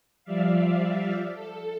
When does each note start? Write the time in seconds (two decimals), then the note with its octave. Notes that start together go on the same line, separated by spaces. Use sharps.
0.24 F3 G3 D5 E5 F5
1.33 A4